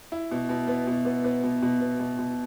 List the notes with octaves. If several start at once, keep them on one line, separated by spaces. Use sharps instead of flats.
E4
B2
B2
B3
B2
B3
B3
B2
B2
B3
B2
B2